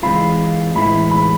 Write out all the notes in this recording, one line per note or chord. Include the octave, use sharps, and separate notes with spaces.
E3 G#3 C4 F4 B5
A2 E3 G#3 B3 E4 B5
B5